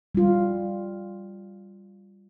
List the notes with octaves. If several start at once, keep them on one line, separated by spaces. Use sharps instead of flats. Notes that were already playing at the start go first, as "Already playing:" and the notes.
G3 F4